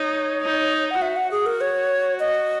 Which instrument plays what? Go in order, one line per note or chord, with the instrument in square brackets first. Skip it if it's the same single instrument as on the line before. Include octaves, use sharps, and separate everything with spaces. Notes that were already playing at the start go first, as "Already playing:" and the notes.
Already playing: [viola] D#4 [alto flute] C#5
[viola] D#4
[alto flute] F#5
[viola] F#4 [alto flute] E5
[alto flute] F#5
G#4
A#4
C#5
D#5